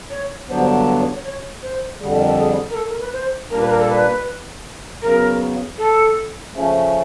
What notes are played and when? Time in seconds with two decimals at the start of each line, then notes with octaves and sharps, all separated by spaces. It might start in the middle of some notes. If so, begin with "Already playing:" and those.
0.10 C#5
0.48 G2 D3 F#3 B3 D4 C5
0.86 B4
0.99 C#5
1.11 C#5
1.24 C#5
1.62 C5
2.00 F2 D3 G3 G#4
2.09 A4
2.19 A#4
2.28 A4
2.37 G#4
2.70 A#4
2.74 A4
2.88 A#4
3.00 B4
3.13 C5
3.50 A#2 G3 A#3 D4 A#4
3.60 B4
3.70 A#4
3.79 A4
3.89 B4
5.02 C#3 F#3 B3 A#4
5.77 A4
6.52 C#3 F3 A3 C#4